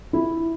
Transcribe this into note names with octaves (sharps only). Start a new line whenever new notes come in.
E4